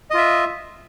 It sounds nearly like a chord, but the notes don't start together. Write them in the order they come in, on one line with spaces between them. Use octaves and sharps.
D#5 F4 E5